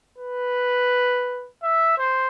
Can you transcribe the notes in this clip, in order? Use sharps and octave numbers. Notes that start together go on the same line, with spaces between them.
B4
E5
C5